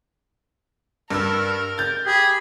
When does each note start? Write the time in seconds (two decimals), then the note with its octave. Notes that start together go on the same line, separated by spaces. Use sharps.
1.10 G2 A#4 E6
1.78 G6 A6
2.06 G4 G#4 B5